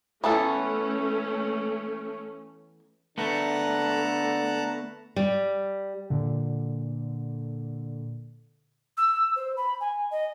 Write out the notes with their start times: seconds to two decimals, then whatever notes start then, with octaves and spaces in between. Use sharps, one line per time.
0.24 E3 A3 B3 C#4 A4
3.18 D3 A3 B3 A5 A#5 F#6
5.16 G3
6.10 A#2 D3
8.97 E6
9.36 C5
9.56 B5
9.80 G#5
10.11 D#5